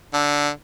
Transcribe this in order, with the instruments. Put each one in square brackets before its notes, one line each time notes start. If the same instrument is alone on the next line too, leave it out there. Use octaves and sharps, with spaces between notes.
[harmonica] D3